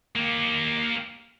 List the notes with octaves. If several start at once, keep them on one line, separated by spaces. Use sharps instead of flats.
A#3 G4